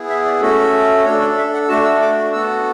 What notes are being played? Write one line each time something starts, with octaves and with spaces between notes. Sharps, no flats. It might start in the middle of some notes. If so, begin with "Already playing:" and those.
Already playing: B3 E4 G#4
E5
D5
A3 C#4 F#4 A4
D4 A4 C#5
D5
E5
F#5
A3 D4 F#4 A5
E6
D6
B3 F#4 A4 E6